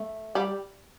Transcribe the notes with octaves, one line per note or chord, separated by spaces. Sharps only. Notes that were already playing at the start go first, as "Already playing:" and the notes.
Already playing: A3
G3